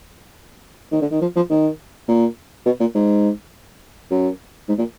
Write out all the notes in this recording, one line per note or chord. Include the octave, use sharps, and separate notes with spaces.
D#3
D3
D#3
F3
F3
D#3
A#2
B2
A#2
G#2
F#2
G#2
A#2